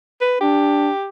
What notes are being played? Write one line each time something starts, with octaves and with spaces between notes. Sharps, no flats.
B4
D4 G4